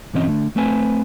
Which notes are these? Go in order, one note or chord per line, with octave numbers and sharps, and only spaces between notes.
B1 G2 E3 C4 C#4 D#5
D3 A3
A3 C4 B4 G#5